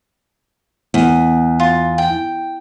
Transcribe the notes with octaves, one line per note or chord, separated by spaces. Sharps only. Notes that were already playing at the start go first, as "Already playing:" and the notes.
E2
F4
G5